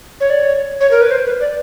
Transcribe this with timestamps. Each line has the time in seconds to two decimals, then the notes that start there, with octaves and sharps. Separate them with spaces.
0.20 C#5
0.30 D5
0.40 C#5
0.81 C#5
0.91 A#4
1.01 B4
1.11 C5
1.26 B4
1.40 D5